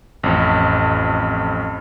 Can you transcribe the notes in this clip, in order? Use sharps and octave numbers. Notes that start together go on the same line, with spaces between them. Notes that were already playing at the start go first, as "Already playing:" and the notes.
A1 F2